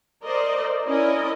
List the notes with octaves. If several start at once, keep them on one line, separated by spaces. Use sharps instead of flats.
A#4 C5 D5 D#5
C#4 E4 A#4 D5 D#5